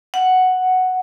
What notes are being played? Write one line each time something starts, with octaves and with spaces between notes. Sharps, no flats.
F#5